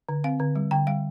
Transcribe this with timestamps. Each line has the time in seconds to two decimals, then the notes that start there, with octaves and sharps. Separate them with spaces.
0.09 D3
0.24 C4 F5
0.40 D3
0.56 G3
0.71 D3 G5
0.87 G3 F5